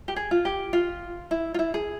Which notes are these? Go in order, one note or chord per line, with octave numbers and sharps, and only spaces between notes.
G4
G#4
F4
G4
F4
E4
F4
E4
G#4